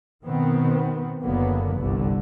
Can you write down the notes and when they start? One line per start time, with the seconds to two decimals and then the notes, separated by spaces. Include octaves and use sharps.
0.25 B2 D#3 B3 C4
1.23 F#1 D3 F#3 A#3 B3
1.78 G1 C2 G2 D3